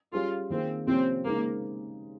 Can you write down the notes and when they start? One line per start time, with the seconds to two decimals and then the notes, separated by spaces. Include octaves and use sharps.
0.13 G3 C#4 F4 G#4
0.50 D#3 A#3 C4 F4 G#4
0.87 C3 F3 A#3 C4 C#4
1.25 C#3 G#3 A#3 C4 D#4